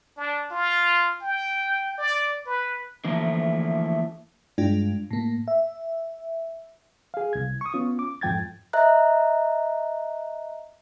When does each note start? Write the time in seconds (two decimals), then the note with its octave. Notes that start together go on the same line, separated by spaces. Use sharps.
0.17 D4
0.51 F4
1.21 G5
1.98 D5
2.46 B4
3.05 D3 E3 F3 A3 A#3
4.58 G2 G#3 D4 F4
5.11 A2 A#3
5.48 E5
7.14 G#4 F5
7.33 C2 G#6
7.61 C#6 D#6
7.74 B3 C#4 F4
7.99 D6
8.21 F2 G#2 F3 G5 G#6 A6
8.73 D#5 E5 A#5 F#6